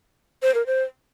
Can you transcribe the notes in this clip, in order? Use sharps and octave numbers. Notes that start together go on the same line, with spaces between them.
C5
A#4
C5